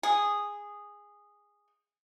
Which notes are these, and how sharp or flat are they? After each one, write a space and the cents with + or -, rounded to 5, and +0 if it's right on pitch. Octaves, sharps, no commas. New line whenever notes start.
G#4 -10